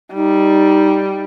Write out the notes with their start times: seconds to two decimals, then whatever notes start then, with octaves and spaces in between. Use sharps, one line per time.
0.14 G3 D#4